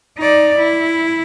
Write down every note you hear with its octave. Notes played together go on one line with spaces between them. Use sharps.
D#4 D5
E4